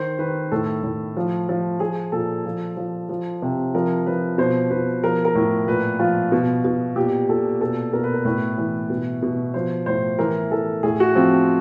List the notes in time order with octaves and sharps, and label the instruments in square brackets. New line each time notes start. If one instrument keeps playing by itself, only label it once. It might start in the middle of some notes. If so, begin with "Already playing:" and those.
Already playing: [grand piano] D#3 C5
D#3 B4
A2 A4
A2
F3
F3
F3 G#4
A#2 A4
F3
F3
F3
C3
F3 A#4
F3 B4
B2 C5
B2 B4
F3 A#4
A#4
A2
A#2 B4
F3 F4
B2
B2
A#2 G4
A#2 A4
B2 A4
B2 A#4
B4
A#4
A2 B4
E3
B2
B2
F3 C5
A2 C5
E3 A#4
E3 A4
A2 G#4
F#4
F3 C4